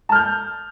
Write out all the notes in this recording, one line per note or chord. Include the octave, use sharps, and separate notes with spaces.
A5 F6 G6